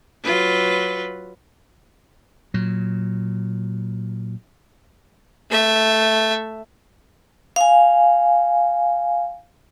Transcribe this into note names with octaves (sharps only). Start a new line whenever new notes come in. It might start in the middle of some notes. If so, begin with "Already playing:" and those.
F#3 F4 B4
A#2 F#3
A3 E5
F5 G#5